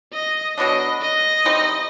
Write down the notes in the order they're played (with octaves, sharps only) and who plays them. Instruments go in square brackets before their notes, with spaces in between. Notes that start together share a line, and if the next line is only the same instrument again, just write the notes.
[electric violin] D#5
[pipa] B2 F#3 B3 D4 [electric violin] D#5
[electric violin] D#5
[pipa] E3 G3 C4 D#4